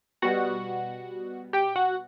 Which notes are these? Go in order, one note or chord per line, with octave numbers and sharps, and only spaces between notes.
B2 G3 B3 F#4 F#5
G4 G5
F#4 F#5